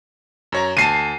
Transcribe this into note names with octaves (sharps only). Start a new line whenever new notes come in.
F#2 C#5 A#5
D2 A5 C7 D#7